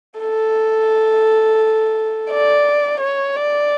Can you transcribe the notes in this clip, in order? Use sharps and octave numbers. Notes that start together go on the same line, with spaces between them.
A4
D5
C#5
D5